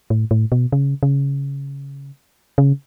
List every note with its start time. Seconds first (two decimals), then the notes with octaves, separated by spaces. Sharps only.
0.10 A2
0.31 A2
0.52 B2
0.72 C#3
1.03 C#3
2.58 C#3